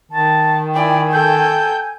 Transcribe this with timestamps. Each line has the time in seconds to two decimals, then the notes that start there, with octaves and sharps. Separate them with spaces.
0.11 D#3 A5
0.75 E4 D5 G5 G#5
1.12 A4 G5 G6